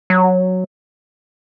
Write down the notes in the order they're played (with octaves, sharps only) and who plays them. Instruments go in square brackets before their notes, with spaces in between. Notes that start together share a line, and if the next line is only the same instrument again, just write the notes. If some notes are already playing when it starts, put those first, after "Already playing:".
[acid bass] F#3